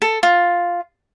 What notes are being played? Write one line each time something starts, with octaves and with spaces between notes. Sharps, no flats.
A4
F4